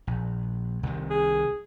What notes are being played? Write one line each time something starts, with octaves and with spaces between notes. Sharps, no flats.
A#1
C2 C3 D#3
G#4